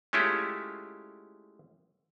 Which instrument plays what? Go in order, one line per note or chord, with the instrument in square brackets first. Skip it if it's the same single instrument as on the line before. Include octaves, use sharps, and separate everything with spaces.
[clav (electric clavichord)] G#3 A3 C#4 E4 F4 G4